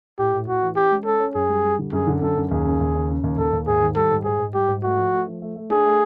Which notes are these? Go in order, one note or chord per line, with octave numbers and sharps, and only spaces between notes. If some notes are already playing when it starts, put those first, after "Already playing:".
A2 G4
A2
A2 F#4
E3
C#4 G4
G#3
C#4 A4
C#4
F#2 G#4
G3
G3
D3
F#2 G#4
D3
F#2 A4
F#2
D#2 G#4
C#3
D#2
C#3
C#3
D#2
D#2 A4
D#2
G#2 G#4
D#3
G3 A4
G#2
G#2 G#4
G#2
G3 G4
G#2
A3 F#4
F3
A3
F3
A3
A3
D4 G#4
A3